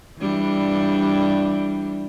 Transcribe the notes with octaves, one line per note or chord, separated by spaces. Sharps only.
E3 G3 D4